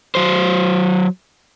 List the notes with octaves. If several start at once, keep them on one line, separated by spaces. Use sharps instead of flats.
F#3 C5